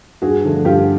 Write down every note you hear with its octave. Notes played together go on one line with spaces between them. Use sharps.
G2 F#4 G#4
D3 F3 A3
G2 F4 G4